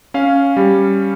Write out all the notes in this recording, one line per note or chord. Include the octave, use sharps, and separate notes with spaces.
C#4 F5
G3